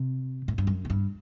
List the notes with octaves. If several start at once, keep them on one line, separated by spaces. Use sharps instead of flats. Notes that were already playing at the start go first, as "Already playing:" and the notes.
Already playing: C3
A2
G2
F#2
A2
G2